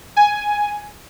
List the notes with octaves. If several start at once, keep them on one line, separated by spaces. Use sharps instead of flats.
G#5